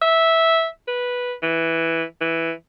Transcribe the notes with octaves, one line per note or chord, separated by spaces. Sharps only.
E5
B4
E3
E3